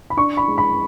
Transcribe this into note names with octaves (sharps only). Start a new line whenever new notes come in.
B5
D4 C#6
B5
G#3
B5